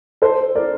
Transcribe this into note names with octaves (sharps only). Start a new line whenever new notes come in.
A4 C5
A#4 D5